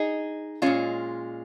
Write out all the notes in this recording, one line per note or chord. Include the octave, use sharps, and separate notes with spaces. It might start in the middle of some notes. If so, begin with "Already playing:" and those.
Already playing: D#4 G#4
A#2 G#3 C#4 F4